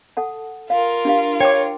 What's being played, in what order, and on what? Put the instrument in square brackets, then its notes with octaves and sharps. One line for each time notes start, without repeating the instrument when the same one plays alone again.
[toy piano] A4 F#5 A5
[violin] F4 A#4 [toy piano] F5
[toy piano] D4 G4 F5
[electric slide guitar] C#5 [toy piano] G5 D6